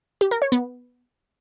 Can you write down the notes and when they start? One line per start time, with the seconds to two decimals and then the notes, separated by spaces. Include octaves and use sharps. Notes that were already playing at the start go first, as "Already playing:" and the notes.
0.21 G4
0.31 A#4
0.42 C#5
0.52 B3